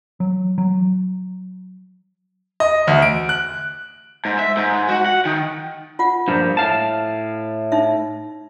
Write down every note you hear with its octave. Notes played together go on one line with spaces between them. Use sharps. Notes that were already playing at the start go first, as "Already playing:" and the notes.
F#3
F#3
D#5
D2
D7
F#6
G#2
E5
G#2
F#4
F#5
D#3
F4 F#5
G2 A#2 F3
A2 F5 A5
D#4 E5